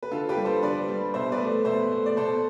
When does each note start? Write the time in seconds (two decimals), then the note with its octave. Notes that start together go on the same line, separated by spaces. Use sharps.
0.03 B4
0.11 D3 F4 A4
0.29 G4 B4
0.37 G3
0.45 A4 C5
0.63 D3 B4 D5
0.88 G3
1.14 B2 C5 E5
1.32 B4 D5
1.40 A3
1.65 B2 C5 E5
1.91 A3
2.06 D5
2.16 B2 A4 C5